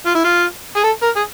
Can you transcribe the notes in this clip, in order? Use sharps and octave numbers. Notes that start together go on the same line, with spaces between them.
F4
E4
F4
G#4
A4
A#4
G#4